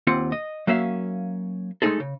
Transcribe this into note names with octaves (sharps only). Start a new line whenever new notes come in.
D#2 C4 F4 F#5
D#5
F#3 A#3 C#4 E5 F5
G#3 A3 C4 D#4 G#4 A4
C#3